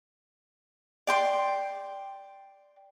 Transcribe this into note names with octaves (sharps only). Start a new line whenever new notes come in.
D5 G5 C6